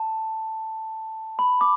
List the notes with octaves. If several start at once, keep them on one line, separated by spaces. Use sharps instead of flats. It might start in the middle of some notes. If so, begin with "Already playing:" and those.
Already playing: A5
B5
D6